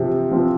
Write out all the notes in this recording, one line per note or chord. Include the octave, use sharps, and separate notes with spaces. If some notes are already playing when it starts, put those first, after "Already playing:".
Already playing: C3 F3 C4
F3 C4